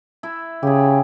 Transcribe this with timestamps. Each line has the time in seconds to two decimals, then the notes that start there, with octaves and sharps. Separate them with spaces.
0.23 E4 E5
0.63 C#3 G4 G#4